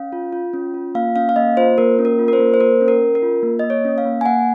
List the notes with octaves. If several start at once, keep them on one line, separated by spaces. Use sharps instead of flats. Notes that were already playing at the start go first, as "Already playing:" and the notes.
Already playing: C#4 F5
F4
F4
C#4
F4
A#3 F5
C#4 F5
F5
A#3 D#5
F4 C5
A#3 A#4
C#4
A#4
F4
A#4
C5
A#3
C5
A#3 A#4
C#4
A#4
C#4
A#4
F4
A#3
A#3 D#5
C#5
C#4
F5
A#3
G#5
A#3 F#5